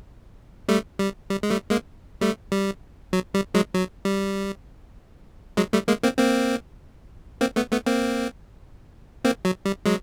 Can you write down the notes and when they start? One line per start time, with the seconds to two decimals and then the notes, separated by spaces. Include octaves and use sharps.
0.68 G3 A3
0.99 G3
1.30 G3
1.43 G#3
1.50 G3 A3
1.70 G#3 A#3
2.21 G3 A3
2.52 G3
3.13 F#3
3.34 G3
3.54 F#3 G#3
3.74 F#3
4.05 G3
5.57 F#3 G#3
5.73 G3 A3
5.88 G#3 A#3
6.03 A#3 C4
6.18 A#3 C4
7.41 A#3 C4
7.56 A3 B3
7.72 A3 B3
7.86 A#3 C4
9.24 A#3 C4
9.45 F#3
9.65 G3
9.86 F#3 G#3